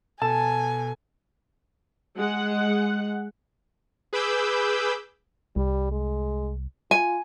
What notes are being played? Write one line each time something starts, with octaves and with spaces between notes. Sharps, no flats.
B2 A4 G#5 A5
G#3 F#5
G#4 B4 B5 D6 E6 G6
C2 G3
G#3
F4 G#5